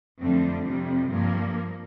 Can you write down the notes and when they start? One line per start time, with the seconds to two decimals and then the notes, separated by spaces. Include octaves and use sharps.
0.20 F2 D3 G3 A3 C4
0.65 F2 C3 G3
1.11 G2 F3 A#3